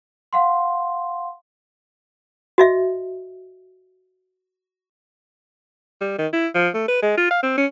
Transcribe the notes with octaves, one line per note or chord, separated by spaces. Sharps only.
F5 F#5 C6
F#4 D#5 E5
G3
D#3
E4
F3
A3
B4
G#3
F4
F5
C4
C#4